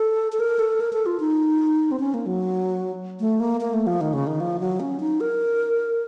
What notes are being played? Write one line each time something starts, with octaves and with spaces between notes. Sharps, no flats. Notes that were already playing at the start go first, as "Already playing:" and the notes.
Already playing: A4
A4
A#4
A4
A#4
A4
F4
D#4
C4
C#4
A#3
F#3
A3
A#3
A#3
A3
F3
D#3
C#3
D#3
F3
F#3
C#4
D#4
A#4